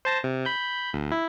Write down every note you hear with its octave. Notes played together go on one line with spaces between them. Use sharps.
C5 A5 A#6
C3
B5 G6
D2
E4